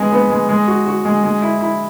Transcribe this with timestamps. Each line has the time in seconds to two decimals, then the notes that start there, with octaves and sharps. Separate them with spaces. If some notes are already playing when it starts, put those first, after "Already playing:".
Already playing: G#3 B3
0.12 B3
0.30 G#3
0.49 G#3
0.68 F#4
0.86 F#4
1.05 G#3
1.23 G#3
1.42 E4
1.61 E4